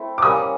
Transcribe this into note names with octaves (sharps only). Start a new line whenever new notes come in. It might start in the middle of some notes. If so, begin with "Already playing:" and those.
Already playing: A3 C4 E4
D6
G3 A#3 C#4 D#6